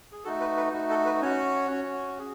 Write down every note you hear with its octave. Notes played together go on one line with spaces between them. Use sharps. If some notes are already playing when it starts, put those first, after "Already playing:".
G#4
A3 D#4 F#4 A4
B4
B4
A3 D#4 F#4
A4
B4
C#4 F#4 C#5
C#4 F#4
G#4